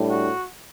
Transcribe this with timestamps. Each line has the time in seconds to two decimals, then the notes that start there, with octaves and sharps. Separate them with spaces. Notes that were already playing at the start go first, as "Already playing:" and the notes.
Already playing: A2 G3 D4
0.10 F#4